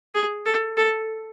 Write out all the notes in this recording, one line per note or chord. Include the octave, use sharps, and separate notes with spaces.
G#4
A4
A4